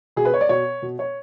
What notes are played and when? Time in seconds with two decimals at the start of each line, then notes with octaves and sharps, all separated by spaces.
0.16 B2 G#4
0.25 B4
0.34 C#5
0.41 D5
0.49 B2 C#5
0.82 B2
0.99 C#5